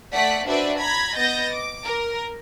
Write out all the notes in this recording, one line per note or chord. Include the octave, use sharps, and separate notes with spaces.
A3 D5 F#5 B6
D4 F#4 B4 C5 D5 E5
A#5 B5 G#6 B6
B3 D#5 G6 A6 A#6
D6
A#4